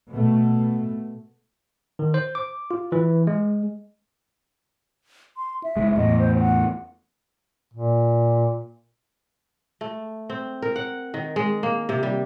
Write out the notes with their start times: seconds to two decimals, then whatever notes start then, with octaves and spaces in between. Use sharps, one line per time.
0.12 B2 A3
1.99 D#3
2.14 C5
2.35 D6
2.71 F4
2.92 E3
3.27 G#3
5.37 C6
5.64 E5
5.76 F#1 G#3
5.97 E2 A2 D#5
6.19 C5
6.40 F#5
7.74 A#2
9.81 A3
10.30 C4
10.62 A#4
10.76 F#5
11.14 D#3
11.36 G#3
11.63 A#3
11.89 C3
12.03 G3